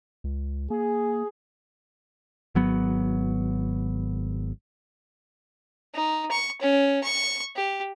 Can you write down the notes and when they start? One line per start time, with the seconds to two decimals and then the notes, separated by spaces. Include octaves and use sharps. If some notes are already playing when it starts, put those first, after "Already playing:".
0.24 C#2
0.70 A#3 G#4
2.55 G#1 F#3 B3
5.94 D#4
6.31 C#6
6.61 C#4
7.03 C#6
7.55 G4